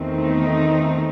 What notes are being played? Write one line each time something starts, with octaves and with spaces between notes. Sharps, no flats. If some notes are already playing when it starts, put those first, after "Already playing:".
Already playing: E2 D#3 A3 C4
D#4